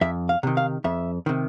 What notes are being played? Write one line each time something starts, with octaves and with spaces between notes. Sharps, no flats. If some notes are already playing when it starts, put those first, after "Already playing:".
F2 E5
F5
C3 D#3
F5
F2 E5
C3 D#3